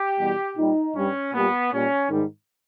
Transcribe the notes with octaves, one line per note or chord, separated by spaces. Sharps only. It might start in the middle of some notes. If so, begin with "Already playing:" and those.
Already playing: G4
E2 B2 G3
A#2 G3 D#4
G2 G3 C#4
A#2 G3 B3
A#2 G3 C#4
G#2 D#3 G3